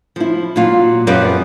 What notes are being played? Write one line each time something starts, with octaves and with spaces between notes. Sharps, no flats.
F3 E4
A#2 F#3 F4
F#2 F3 B3 G4 D5